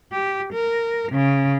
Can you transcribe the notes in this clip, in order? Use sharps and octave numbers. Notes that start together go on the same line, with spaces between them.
G4
A#4
C#3